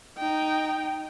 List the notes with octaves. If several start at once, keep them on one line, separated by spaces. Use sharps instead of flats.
D#4 G5